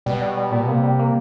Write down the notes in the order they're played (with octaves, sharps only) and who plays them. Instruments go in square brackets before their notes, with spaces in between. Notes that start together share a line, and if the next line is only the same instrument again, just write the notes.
[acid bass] B2 [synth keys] G3
[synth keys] G3
G3
[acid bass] A#2 [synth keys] G3
[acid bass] B2
[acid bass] C3 [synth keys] A#3
[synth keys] G3
A#3